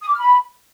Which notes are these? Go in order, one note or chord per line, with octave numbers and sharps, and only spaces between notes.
D#6
D6
F6
B5